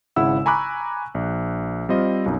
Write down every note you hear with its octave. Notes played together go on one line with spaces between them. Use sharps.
G#1 C#3 E4 E5 F#5 E6
G#5 A#5 B5 C#6 D6 F#6
A#1
G3 C4 F4 D#5
B1 F#2 D#4